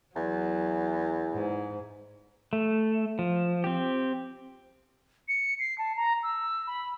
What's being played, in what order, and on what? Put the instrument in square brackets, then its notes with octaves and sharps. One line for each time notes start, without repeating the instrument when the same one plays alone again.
[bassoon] E2 [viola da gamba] F#3
[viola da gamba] G#2
[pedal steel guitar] A3
F3
C4 G4
[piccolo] C#7
C7
A5
A#5
E6
B5